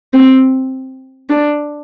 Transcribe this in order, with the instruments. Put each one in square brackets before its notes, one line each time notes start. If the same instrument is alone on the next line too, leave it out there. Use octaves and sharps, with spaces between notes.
[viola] C4
D4